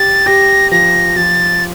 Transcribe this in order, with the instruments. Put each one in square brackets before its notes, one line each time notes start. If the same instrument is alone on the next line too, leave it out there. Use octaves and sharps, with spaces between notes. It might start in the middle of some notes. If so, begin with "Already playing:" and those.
Already playing: [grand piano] G4 [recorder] A6
[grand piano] G4 [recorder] A#6
[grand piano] F3 [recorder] A#6
[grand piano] F3 [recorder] A6